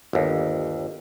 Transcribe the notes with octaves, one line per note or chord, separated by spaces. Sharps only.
G1 D#2